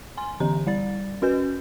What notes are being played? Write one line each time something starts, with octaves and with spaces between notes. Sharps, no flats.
G#5 C6
D3 E3 G4 A#5
G3 D5 A6
C#4 F#4 B4 G6